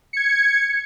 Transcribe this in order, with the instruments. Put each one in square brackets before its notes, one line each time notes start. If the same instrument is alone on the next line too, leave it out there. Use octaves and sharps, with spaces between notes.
[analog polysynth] G#6 C#7